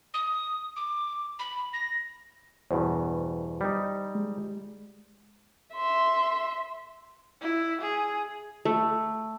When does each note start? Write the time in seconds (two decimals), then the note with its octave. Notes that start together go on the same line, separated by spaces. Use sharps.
0.14 D#6
0.76 D6
1.39 B5
1.73 A#6
2.71 E2 G2 B2 C5
3.61 G3 D#4
4.15 G#3
5.73 E5 C6
7.42 E4
7.81 G#4
8.65 A3